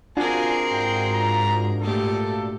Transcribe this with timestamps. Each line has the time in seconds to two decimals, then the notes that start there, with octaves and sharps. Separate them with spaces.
0.17 C4 D4 F4 F#4 G#4 A#4 G#5
0.72 G#2 G5
1.13 A#5
1.81 A#2 A3 G4 A4